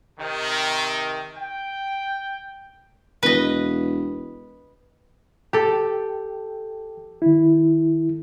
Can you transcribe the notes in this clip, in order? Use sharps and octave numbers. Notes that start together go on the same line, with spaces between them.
C3 D#3
G5
E1 B4 D#5
G4 A4 G5
D#3 E4